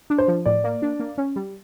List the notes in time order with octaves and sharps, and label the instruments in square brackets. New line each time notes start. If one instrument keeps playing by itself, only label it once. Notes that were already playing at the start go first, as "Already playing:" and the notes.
[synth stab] D4
[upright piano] C5
[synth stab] F3
[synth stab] A2 [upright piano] D5
[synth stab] A#3
D4
A#3
C#4
G3